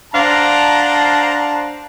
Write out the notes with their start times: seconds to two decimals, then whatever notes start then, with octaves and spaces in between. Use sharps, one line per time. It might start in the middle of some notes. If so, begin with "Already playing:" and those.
0.14 D4 C5 F5 F#5 A5 A#5